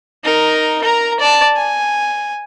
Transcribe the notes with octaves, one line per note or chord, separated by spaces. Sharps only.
D#4 A#4
A#4 A#5
D5 A5
G#5